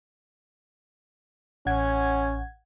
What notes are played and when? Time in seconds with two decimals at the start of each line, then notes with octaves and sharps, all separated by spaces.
1.66 A1 C#4 F#5 G#6